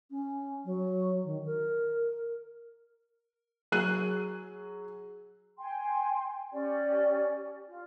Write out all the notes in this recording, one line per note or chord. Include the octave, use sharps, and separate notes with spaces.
C#4
F#3
D#3
A#4
F#3 G#4 F#6 D#7
G5 G#5 C6
C#4 G4 D5
F4